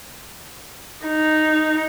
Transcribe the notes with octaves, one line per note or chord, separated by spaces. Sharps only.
D#4